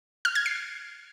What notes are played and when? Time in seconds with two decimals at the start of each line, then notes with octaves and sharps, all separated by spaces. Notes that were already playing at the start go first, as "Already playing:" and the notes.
0.25 F6
0.35 G#6
0.46 C7